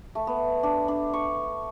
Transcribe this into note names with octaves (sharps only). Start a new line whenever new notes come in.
A3
B3
D4
D4
C#6